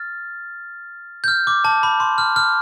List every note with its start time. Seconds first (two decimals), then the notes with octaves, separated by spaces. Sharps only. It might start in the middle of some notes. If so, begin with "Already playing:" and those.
Already playing: F6 A6
1.24 G6
1.28 F6
1.47 D6
1.65 A5
1.83 B5
2.00 C6
2.18 F6
2.36 F6